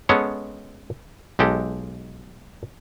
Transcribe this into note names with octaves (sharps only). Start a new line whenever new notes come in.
G#3 B3 C#4 A4 C#5
B1 G#3 G4 A4